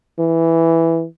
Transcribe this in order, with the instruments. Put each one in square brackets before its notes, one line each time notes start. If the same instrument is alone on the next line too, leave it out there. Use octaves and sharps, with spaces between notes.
[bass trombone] E3